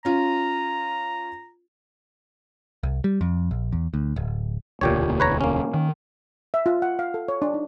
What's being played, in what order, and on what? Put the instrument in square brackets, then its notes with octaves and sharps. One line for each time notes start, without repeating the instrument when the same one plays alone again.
[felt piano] C#4 F4 [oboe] A#5
[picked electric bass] C2
G3
F2
A#1
E2
D2
D1
[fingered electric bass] E1 D2 [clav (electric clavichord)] A#2 G4 C#5
[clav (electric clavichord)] B4 C#5 A#5
A#3 C#4
[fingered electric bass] D#3
[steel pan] E5
F4
F#5
F5
A4
C#5
D4
D#4